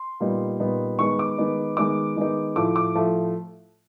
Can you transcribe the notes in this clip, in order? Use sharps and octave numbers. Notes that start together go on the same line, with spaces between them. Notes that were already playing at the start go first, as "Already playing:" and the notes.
Already playing: C6
A#2 G3 B3 D#4
A#2 G3 B3 D#4
D#3 G#3 B3 D#4 C#6
D6
D#3 G#3 B3 D#4
D#3 G#3 B3 D#4 D6
D#3 G#3 B3 D#4
A2 F3 A3 D6
D6
A2 F3 A3